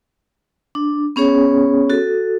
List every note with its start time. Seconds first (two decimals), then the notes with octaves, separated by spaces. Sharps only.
0.75 D4
1.16 B3 C#4 G#4 C#5
1.90 F#4 A4